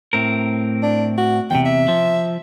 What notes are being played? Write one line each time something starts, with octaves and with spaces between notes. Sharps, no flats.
A2 C4 A#4
D4
F#4
E2 C3 G5
E5
F3